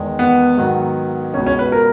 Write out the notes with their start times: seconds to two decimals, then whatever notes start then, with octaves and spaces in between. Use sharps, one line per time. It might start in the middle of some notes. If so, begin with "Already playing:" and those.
Already playing: E2 D#3 G#3
0.19 B3
0.57 G#2 D#3 F#3 B3
1.33 C#2 B2 G#3 C#4
1.46 C#4
1.59 B4
1.72 A#4